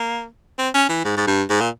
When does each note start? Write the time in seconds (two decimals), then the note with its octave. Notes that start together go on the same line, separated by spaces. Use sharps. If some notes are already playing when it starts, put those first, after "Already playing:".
Already playing: A#3
0.58 C4
0.74 C#4
0.89 E3
1.04 G#2
1.17 G#2
1.27 G2
1.50 G#2
1.61 A#2